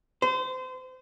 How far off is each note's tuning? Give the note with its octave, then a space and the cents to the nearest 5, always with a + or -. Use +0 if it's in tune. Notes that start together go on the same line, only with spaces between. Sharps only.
C5 -30